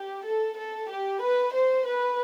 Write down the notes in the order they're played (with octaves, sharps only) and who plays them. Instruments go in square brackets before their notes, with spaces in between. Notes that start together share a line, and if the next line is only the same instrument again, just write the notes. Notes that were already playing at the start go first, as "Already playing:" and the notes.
Already playing: [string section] G4
A4
A4
G4
B4
C5
B4